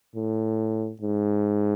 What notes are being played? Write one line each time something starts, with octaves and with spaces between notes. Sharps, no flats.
A2
G#2